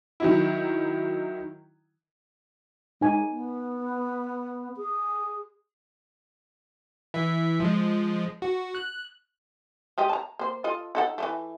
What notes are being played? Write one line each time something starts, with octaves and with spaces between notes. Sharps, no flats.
D#3 F#3 E4
G#3 D#4 G#5
B3
G#4
E3 E5
F3 G#3
F#4
F#6
G#3 G4 D#5
A5 A#5
A#3 C5
F4 A4 D#5
D#4 A4 F#5
E3 G#3 A3